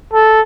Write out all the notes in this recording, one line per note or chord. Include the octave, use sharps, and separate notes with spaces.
A4